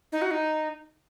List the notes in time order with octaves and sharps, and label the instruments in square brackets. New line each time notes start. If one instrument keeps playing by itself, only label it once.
[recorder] D#4
F#4
D#4